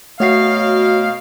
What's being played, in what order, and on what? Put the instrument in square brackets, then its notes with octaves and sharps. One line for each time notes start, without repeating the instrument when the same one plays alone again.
[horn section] B2 D#5 F5 [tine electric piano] A3 C7 [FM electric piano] F#4 C#5